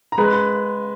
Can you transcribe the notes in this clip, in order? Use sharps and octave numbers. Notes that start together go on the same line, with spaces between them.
A#5
G#3 B4 B5
B5